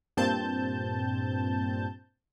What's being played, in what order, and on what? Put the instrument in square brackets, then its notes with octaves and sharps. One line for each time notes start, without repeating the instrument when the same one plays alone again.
[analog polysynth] G2 A#2 C4 A5 G6